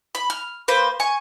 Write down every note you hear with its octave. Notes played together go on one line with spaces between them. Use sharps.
B5
F6
A#3 B4 C5
G#5 C#6